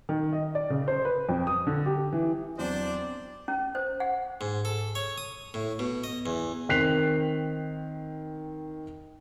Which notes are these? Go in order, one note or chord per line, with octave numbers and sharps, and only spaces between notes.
D#3
D#5
D5
C#3
C5
B4
F2
D#6
D3
G4
E3
E2 F#3 C4 D4 C5 D5
C#4
C5
F#5
G#2
A4
C#5
D#6
A2
B2
D#5
E2
D#3 C4 F#6 B6 C7 F7